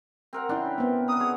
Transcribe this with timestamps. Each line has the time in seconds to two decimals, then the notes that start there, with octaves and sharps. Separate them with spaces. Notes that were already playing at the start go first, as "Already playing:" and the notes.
0.33 C4 A#4 F#5
0.49 C#4 D4 E4 G5
0.78 B3 C4
1.08 F#5 A#5 D#6
1.20 G#4 C#5